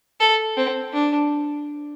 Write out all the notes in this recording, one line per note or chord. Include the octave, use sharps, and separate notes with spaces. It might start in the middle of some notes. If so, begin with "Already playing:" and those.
A4
C4
D4